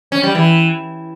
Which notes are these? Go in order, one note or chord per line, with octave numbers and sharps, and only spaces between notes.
C#4
G3
E3